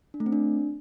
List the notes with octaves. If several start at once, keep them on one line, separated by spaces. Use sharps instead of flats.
D4
A3
C4
D4